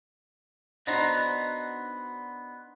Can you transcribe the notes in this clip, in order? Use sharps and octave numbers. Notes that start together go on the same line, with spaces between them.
B3 D4 D#4 F#4 C5 A#5